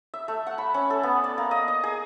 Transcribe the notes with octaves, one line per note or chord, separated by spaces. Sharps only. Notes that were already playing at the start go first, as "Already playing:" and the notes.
E5
A3
F#5
B5
C#4
A4
B3
D5
A#3
D#5
D#5
G#4